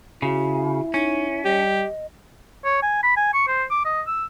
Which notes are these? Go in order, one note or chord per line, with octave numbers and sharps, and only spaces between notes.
C#3 E4 F#4
C#4 D#4
G3 G4 D#5
C#5
G#5
B5
G#5
C#6
C5
D6
D#5
E6